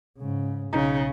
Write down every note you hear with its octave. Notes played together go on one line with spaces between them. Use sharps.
G#2 C#3
B1 C#3 D#4